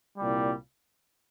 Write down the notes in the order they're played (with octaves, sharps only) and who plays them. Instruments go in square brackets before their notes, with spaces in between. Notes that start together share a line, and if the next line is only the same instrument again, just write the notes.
[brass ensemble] C2 A#2 G3